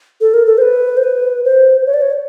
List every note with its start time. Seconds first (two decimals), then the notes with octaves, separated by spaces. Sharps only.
0.21 A4
0.34 A#4
0.46 A4
0.58 C5
0.62 B4
0.97 C5
1.04 B4
1.45 C5
1.86 C#5
1.94 D5
2.02 C#5